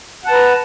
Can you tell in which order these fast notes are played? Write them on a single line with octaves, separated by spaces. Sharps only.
F#5 A5 B4 A#5